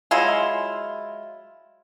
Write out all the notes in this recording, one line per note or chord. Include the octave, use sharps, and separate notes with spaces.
F#3 G#3 E4 F4